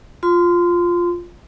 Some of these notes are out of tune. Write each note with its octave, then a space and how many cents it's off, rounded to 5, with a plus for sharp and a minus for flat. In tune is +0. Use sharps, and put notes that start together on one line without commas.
F4 +0 C6 -25